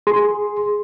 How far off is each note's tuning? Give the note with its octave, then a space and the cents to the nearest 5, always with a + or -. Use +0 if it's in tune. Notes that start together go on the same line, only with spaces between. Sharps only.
G#4 +0 C6 +0